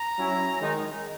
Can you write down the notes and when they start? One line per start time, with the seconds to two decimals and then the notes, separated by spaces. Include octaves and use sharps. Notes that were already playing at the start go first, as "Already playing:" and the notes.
Already playing: A#5
0.17 F#3 C#4 E4
0.59 D#3 G#3 D#4